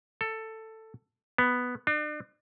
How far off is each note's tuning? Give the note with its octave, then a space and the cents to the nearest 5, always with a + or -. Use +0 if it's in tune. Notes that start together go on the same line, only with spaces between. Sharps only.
A4 +10
B3 +0
D4 +40